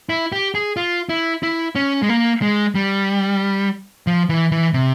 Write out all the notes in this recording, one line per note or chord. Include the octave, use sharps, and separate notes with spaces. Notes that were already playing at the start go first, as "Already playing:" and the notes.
E4
G4
G#4
F4
E4
E4
C#4
G#3
A#3
G#3
G3
F3
E3
E3
C3